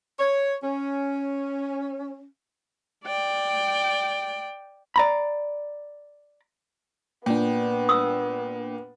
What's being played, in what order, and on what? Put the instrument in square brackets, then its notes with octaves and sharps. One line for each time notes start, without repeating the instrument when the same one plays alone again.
[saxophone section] C#5
C#4
[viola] D5 G5
[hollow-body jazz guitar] D5 A#5 B5
[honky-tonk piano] A#2 [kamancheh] B3 [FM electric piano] D4 G5
[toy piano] D#6 E6